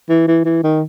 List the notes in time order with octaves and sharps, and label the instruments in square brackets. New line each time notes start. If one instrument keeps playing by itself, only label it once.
[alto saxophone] E3
E3
E3
D#3